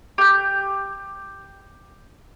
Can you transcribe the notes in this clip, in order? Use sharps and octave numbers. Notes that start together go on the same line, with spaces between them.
G4 G6